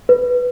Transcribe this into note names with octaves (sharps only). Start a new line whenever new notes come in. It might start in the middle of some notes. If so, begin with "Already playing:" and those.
B4